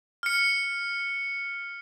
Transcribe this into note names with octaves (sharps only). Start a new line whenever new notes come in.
F6 C#7